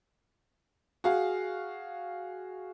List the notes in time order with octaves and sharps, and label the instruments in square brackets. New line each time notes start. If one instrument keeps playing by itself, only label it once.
[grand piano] F#4 G#4 F5